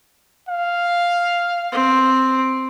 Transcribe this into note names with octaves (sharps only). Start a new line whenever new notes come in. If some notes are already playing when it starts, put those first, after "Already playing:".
F5
C4